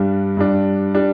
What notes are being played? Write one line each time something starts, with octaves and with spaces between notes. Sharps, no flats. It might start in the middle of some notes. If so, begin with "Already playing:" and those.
Already playing: G2 G3 D4
G2 G3 D4
G3 D4